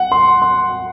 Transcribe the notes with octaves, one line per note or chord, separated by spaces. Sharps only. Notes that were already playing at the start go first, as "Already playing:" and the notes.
Already playing: F#5
C6
C6